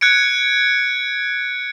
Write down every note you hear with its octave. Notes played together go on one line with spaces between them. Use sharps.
F#6 G#6 C#7 D7